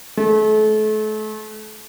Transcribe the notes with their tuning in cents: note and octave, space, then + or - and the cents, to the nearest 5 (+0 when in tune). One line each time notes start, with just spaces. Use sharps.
A3 -35